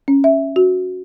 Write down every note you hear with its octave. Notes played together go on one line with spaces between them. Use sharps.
C#4
E5
F#4